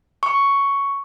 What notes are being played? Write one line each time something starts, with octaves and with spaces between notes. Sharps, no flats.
C#6